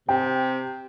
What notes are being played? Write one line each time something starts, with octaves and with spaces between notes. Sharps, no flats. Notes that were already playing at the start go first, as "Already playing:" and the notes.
C3 G5